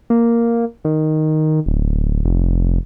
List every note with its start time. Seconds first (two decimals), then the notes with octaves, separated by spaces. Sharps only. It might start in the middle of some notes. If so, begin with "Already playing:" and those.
0.10 A#3
0.85 D#3
1.66 D1
2.25 F1